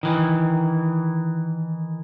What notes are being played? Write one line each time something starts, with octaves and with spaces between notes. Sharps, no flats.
D#3 E3